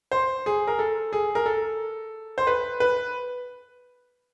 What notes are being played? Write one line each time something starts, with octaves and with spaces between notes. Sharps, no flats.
C5
G#4
A#4
A4
G#4
A#4
A4
C5
B4
B4